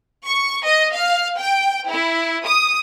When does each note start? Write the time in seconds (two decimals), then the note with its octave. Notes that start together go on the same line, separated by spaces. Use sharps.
0.25 C#6
0.65 D#5
0.94 F5
1.38 G5
1.90 E4
2.44 D#6